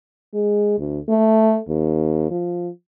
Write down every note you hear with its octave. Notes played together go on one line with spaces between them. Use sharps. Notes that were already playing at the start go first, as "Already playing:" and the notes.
G#3
D2
A3
D#2
F3